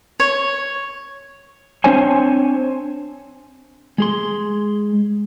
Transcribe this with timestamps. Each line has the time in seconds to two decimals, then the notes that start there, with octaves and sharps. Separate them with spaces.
0.20 C#5
1.84 C4 D4 C5 C#5 G#5
3.98 G#3 G#4 C6